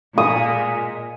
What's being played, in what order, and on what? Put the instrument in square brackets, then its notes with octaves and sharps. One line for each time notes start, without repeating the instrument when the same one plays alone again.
[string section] A#2 [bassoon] G#3 [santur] D#6